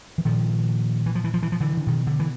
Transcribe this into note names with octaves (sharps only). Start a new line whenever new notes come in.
E3
A#2 D#3 F3
E3
F3
E3
F3
E3
F3
D3 E3
D3
B2 D#3
D3
E3